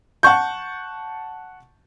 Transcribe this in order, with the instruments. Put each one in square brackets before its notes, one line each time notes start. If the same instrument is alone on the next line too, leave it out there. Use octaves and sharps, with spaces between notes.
[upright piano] F#5 A5 C#6 G6